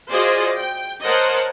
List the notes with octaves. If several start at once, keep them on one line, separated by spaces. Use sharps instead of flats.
F4 F#4 G#4 C5 D5 D#5
G5
A#4 C5 C#5 D#5 F#5 A5